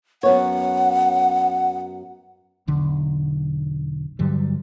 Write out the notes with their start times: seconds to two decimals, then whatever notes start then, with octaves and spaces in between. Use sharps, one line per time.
0.23 F#2 B3 C#5 F#5
2.67 E1 B1 D3
4.19 G2 D3 F#3 G3